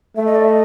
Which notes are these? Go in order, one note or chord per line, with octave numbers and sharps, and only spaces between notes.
A3 E5
D#5
D5
E5
D#5